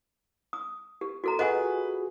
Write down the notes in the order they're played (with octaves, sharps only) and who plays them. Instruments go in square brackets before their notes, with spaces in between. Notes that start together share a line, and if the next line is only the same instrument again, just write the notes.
[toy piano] D#6
G4
F#4 A4 A#5
[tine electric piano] F4 F#4 G#4 [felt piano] B4 [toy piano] D#5 F#5 G#5